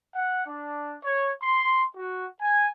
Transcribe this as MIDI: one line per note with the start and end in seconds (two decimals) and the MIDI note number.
0.15 0.43 78
0.47 0.96 62
1.04 1.31 73
1.42 1.84 84
1.96 2.26 66
2.41 2.69 80